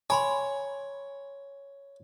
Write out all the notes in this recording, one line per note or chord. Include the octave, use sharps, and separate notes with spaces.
C#5 G#5 B5 C6